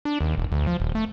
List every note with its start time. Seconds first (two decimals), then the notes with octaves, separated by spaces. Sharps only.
0.05 D4
0.21 D#2
0.38 E1
0.52 D2
0.67 F3
0.80 D#1
0.95 A3